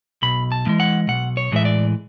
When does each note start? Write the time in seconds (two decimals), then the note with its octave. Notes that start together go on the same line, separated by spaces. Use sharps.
0.22 B1 B5
0.52 A5
0.66 A2 E3 G#3
0.80 F#5
1.08 B1 F#5
1.37 C#5
1.52 A2 E3 G#3 E5
1.65 D5